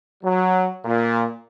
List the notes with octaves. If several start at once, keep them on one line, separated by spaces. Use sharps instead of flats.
F#3
A#2